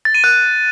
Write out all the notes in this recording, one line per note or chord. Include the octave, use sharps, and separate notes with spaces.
A6
D#7
F#6